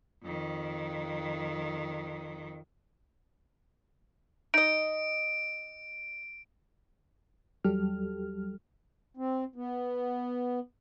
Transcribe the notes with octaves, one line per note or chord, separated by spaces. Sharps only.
F2 D#3
D#4 D#5 D7
E2 F#3 G3 G4 A4 F6
C4
B3